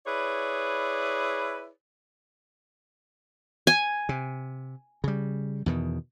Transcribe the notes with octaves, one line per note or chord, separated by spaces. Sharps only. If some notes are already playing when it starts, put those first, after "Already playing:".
E4 G#4 B4 C#5 D5
G#5
C3
C#3 G3
E2 B2 D#3